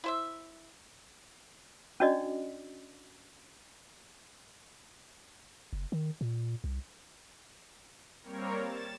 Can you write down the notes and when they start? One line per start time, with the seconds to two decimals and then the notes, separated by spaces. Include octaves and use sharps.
0.04 E4 C5 E5
2.00 C#4 D4 F#4 D5 D#5
5.73 F#1
5.92 D#3
6.21 A#2
6.64 C2
8.23 G3 A#3 C4 A#4 C#5
8.62 A6 E7